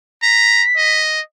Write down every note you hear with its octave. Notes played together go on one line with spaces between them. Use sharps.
A#5 B6
D#5